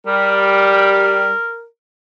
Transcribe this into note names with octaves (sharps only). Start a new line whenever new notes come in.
G3 A#4